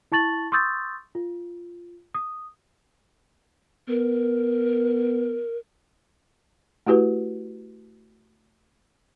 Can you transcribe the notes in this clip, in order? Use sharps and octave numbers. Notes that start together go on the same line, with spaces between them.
E4 A5 C#6 A6 F#7
C6 C#6 D#6 E6 G6 A6
F4
D#6
B3 A#4
A3 E4 F#4 G4 B4